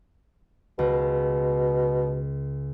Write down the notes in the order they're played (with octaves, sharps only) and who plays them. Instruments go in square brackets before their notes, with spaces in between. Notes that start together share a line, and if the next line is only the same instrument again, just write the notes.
[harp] C#2 [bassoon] B2